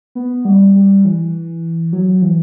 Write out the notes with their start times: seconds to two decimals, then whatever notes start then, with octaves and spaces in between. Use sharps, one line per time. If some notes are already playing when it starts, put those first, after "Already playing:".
0.15 B3
0.45 G3
0.75 G3
1.05 E3
1.93 F#3
2.22 E3